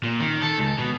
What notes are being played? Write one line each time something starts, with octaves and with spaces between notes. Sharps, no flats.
A#2
D#3
A4
C#2
B2